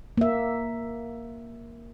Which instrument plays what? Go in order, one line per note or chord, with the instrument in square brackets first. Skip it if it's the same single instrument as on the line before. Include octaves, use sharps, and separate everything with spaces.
[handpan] A#3 E5